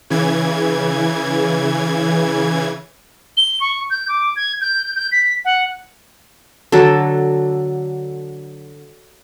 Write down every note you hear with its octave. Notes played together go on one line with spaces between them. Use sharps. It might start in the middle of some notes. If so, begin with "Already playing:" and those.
C#3 E3 G#6
G7
C#6
G6
D6
G#6
G6
G6
B6
F#5
D3 F#3 A4